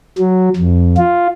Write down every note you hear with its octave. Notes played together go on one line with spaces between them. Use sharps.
F#3
F2
F4